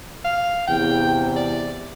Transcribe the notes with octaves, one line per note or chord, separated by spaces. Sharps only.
F5
E2 C3 G5
D5